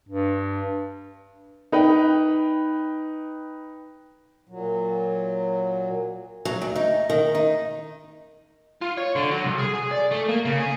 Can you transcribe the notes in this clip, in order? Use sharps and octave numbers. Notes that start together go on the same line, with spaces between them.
G2
D#4 B4 G5
A#2 F#3
F#3
D2
D#4
D#3
D#4
F4
C#5
D3
F#3
C2
G#4
G#4
D5
A3
A#3
C#3
G#4